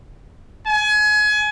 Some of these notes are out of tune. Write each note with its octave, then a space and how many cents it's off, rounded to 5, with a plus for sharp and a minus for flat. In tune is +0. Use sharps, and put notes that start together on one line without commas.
G#5 +30